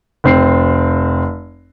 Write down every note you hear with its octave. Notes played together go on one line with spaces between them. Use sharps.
F1 C4 C7